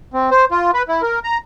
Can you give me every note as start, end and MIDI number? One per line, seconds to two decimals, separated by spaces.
0.13 0.30 60
0.31 0.45 72
0.51 0.71 65
0.74 0.83 71
0.88 1.02 64
1.02 1.19 70
1.24 1.38 82